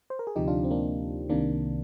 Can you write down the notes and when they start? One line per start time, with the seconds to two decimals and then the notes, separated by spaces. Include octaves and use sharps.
0.10 C5
0.19 A#4
0.27 G#4
0.36 D2 C3 F3 D#4 G4
0.48 D4 F4
0.64 C4
0.71 A#3 D4
1.29 C2 C3 D#3 A#3 D4